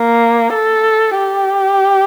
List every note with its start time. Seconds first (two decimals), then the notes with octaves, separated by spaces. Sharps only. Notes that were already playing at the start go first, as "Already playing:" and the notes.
Already playing: A#3
0.54 A4
1.18 G4